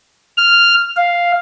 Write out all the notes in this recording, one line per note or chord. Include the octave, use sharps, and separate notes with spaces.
F6
F5